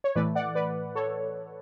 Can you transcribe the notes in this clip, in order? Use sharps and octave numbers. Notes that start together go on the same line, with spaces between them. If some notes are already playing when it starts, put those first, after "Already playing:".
C#5
A2 E3 A3 B4 D5
D5 F#5
B4 D5
A4 C#5